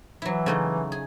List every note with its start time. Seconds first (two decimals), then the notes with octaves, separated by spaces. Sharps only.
0.22 E3 F#3 E4
0.46 C#3 A3 D#4
0.92 G#4